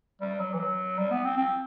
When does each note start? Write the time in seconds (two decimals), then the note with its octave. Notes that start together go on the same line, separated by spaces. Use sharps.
0.21 G3
0.40 F#3
0.53 E3
0.59 F#3
0.98 G3
1.11 B3
1.25 C4
1.37 C4